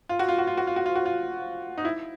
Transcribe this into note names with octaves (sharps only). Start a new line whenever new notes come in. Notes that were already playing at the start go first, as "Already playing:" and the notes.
F4
F#4
F4
F#4
F4
F#4
F4
F#4
F4
F#4
F4
D#4
E4